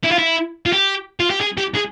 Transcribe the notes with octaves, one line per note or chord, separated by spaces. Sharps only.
E4
F4
E4
F4
G4
F4
G4
G#4
G4
G#4